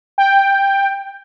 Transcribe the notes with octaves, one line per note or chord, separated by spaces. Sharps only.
G5